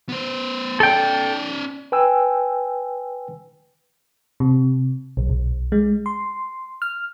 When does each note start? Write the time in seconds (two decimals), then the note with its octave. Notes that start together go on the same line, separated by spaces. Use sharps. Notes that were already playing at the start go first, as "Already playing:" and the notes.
0.09 B3 C5
0.80 C#4 A4 D5 G5
1.92 B4 G5 G#5 E6
4.40 C3
5.17 B1
5.30 B1
5.72 G#3
6.06 C6
6.82 F6